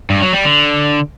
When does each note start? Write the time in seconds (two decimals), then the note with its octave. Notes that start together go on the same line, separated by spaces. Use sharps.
0.10 G2
0.21 F#3
0.33 G3
0.45 D3